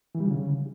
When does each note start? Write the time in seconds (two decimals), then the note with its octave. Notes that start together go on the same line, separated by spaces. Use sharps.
0.15 E3
0.20 G3
0.25 D3
0.31 C#3